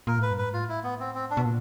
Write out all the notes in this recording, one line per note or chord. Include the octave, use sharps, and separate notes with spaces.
A#2 A#4
A2 B4
G2
G#2 B4
A2 F4
E4
B3
C4
C4
D4
B2
A#2